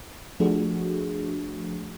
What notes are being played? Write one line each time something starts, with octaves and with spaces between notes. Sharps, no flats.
F3 A3 D4 F#4 G#4